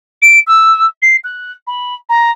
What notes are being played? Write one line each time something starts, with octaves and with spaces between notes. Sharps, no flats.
D7
E6
C7
F#6
B5
A#5